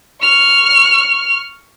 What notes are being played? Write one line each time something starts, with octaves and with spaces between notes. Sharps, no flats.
C#6 F6